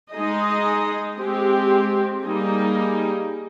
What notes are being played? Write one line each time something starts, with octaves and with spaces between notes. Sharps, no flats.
G#3 D#4 G#4 D#5
G#3 C4 G4
G3 A#3 D#4 G#4 D#5